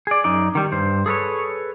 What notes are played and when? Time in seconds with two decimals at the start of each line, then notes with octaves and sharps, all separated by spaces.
0.07 G#4 D5
0.24 F#2 D#4 D5
0.55 D#3 G3
0.72 G2 C5
1.06 G#4 A4 B4 C#5